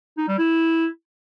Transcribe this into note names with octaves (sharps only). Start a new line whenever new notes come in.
D#4
G3
E4